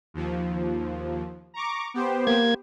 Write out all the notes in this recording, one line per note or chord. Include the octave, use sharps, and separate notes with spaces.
D#2 F3
A#5 C#6 D6
B3 G4 C5
A#3 G#6